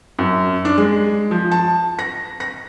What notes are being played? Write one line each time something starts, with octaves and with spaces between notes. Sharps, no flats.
F#2
D4
G#3
F3
A5
A#6
A#6